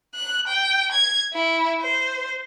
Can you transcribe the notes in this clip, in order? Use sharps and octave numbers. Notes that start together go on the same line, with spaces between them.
F#6
G5
G#6
E4
C5